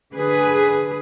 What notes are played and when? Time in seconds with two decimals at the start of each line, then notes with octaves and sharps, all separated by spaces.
0.14 D3 G#4 B4